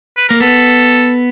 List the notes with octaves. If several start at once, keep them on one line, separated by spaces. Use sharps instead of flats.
B4
A#3 A#4
B3 A4